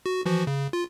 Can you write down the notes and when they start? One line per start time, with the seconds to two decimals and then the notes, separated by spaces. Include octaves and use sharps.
0.06 F#4
0.26 E3 F3 F#4
0.47 C#3
0.73 F4